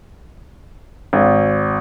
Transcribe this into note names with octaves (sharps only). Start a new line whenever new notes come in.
G#1